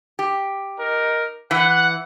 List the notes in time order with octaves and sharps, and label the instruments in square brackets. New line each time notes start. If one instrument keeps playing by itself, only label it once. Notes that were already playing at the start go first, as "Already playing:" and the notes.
[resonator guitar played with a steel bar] G4
[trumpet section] D#4 A#4
[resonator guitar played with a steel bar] E3 [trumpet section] F#5